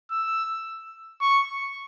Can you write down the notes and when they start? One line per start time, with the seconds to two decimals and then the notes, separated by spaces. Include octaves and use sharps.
0.11 E6
1.22 C#6